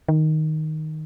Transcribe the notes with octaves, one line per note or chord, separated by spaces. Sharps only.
D#3